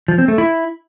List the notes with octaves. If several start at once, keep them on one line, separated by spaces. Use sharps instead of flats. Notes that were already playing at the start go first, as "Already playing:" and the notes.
F3
C4
A3
E4